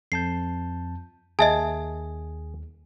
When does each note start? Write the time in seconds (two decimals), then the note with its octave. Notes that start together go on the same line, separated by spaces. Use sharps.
0.12 F2 A5 G6 C7
1.39 D#2 G#4 D#5 E5 A5